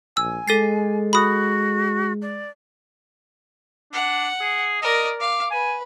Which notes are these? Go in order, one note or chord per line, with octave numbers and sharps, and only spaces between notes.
A#1 G#5 E6
G#3 A4 A6 C7
F#4 B5 D#6
D5
D4 F#5
G#4
A#4 D5 D#5
F5 D6
B4 G#5